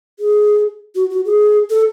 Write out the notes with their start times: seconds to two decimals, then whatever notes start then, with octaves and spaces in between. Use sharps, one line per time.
0.19 G#4
0.96 F#4
1.10 F#4
1.25 G#4
1.70 A4